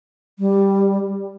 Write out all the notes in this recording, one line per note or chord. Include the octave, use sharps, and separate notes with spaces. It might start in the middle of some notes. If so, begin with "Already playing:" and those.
G3